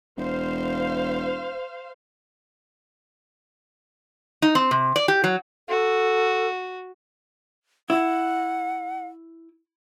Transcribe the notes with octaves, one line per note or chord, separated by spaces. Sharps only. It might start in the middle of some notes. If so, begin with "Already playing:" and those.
E1 C5 F5
D#4
C4
C3
D5
G4
F#3
F#4 A4
E4 F#5